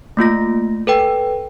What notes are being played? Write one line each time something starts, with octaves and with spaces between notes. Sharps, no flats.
A3 A#3 F4 A#6
A4 B4 G5